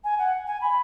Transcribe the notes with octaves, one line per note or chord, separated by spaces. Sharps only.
G#5
F#5
G#5
B5